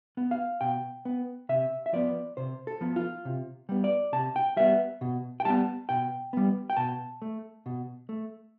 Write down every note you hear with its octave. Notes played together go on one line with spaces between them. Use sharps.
B3
F5
B2 G5
B3
C3 E5
E5
F3 B3 D5
C3 C5
A4
F3 B3
F4
C3
G3 B3
D5
C3 A5
G5
G3 B3 E5
B2
G5
G3 B3 A5
B2 G5
G3 B3
G5
B2 A5
A3
B2
A3